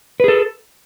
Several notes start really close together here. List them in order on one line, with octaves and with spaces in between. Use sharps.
B4 G#4 A4